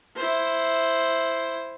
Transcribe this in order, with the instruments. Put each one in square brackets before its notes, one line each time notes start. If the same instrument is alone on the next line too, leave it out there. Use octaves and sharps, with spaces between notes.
[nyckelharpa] E4 C5